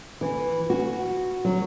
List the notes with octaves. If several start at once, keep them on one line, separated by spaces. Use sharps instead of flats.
E3
F#4
F#3